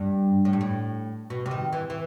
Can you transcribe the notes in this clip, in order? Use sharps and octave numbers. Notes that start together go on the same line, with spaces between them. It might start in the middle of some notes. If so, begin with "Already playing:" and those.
Already playing: G2
A2
G2
A2
B2
C3
D#3
E3
E3